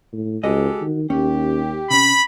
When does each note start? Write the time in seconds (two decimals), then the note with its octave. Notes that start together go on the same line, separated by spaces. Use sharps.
0.13 A2
0.43 C#2 G#3 F#4 G4 A4 D#5
0.82 D#3
1.10 D#2 C#4 G4
1.91 C3 C#4 B5